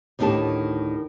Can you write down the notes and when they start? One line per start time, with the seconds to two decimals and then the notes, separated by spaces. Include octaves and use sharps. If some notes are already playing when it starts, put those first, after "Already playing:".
0.19 D2 A2 D#3 D4 G4 A5